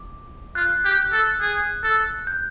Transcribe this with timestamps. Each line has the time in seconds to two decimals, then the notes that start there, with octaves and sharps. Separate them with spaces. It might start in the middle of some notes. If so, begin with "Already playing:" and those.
Already playing: D6
0.55 F4 F#6
0.85 G4
1.13 A4
1.41 G#4
1.83 A4
2.27 G6